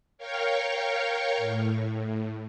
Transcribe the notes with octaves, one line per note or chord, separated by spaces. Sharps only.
A#4 C#5 F5 G5 C#6
A2